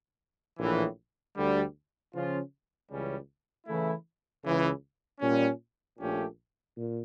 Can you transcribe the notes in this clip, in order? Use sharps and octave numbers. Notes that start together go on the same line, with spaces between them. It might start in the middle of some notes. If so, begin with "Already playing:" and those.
A#1 A2 E3
D2 D3 G3
C#3 F3 C#4 F4
C#2 C#3 E3 G3 C#4
C#3 E3 A3 E4
C#2 C#3 E3
A#2 G3 C#4
A#1 A#2 A3 C#4 G4
A#2